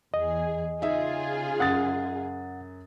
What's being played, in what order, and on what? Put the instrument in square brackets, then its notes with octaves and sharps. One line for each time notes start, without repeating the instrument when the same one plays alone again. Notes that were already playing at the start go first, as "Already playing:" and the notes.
[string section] E2 G#4 [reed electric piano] D#5
[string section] C#3 F4 G#4 [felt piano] D#4 E5
[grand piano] F#2 D#6 A6 [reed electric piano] F#5